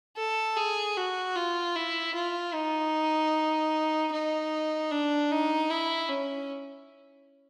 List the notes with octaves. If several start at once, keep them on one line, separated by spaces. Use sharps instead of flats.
A4
G#4
F#4
F4
E4
F4
D#4
D#4
D4
D#4
E4
C#4